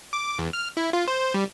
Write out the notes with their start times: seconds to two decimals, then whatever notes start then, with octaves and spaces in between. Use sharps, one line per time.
0.13 D6
0.39 E2
0.53 F6
0.77 E4
0.93 F4
1.08 C5
1.34 G3